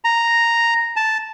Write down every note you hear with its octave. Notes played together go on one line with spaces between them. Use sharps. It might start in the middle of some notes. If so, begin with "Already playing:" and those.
A#5
A5